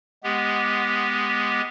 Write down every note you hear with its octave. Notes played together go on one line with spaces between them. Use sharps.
G#3 B3 G4